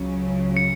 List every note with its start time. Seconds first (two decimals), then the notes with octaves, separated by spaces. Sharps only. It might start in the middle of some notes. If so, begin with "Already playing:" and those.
Already playing: C#2 C#3 F#3 C#4
0.57 C#7